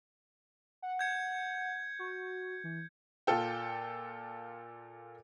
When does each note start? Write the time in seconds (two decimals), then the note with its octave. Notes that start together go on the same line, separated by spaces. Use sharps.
0.82 F#5
0.99 G6 G#6 C#7
1.99 F#4
2.64 E3
3.27 A#2 F4 A4 G5